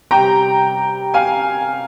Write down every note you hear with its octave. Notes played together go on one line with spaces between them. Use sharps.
C3 G3 G5 A#5
F5 G#5